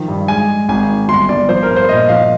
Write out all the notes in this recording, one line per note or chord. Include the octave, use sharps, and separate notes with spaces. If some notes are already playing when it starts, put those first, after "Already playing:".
Already playing: D#3 F3
G2
G#3 G#5
G#3
G#1 G#5
D#3
G1 C6
G1 D5
F3 C5
A#4
G2
C5
A#2 D#5
F3 F5